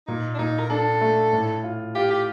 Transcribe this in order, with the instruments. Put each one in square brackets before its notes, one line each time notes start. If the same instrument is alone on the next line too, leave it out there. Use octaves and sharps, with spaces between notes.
[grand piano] A#2 [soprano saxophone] D#4
[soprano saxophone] D4
[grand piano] A#2 [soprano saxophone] D#4
[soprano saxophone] A#4
[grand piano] D4 [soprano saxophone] A4
[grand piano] A3
A2
F4
[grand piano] F4 [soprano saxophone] G4
[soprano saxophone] G4